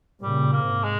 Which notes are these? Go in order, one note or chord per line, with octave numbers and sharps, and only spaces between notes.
A#2 C#3 G3
A#3
G#2 C3
G#3